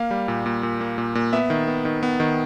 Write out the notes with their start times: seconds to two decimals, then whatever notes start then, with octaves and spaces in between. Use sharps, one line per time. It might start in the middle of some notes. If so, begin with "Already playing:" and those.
Already playing: A#3 F5
0.11 G3
0.28 A#2
0.46 A#2
0.63 A#2
0.81 A#3
0.98 A#2
1.15 A#2
1.33 B3 E5
1.50 D#3
1.68 B3
1.85 D#3
2.03 B3
2.20 D#3